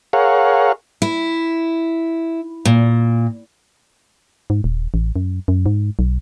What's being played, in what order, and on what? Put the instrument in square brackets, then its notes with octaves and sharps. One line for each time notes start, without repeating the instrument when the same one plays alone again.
[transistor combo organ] G#4 A#4 C#5 F5 F#5
[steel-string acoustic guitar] E4
A#2
[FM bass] G#2
D#1
A1
F#2
F#2
G#2
B1